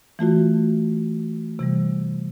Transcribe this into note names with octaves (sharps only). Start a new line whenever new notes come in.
E3 A3 F4 F#4
C3 E3 G3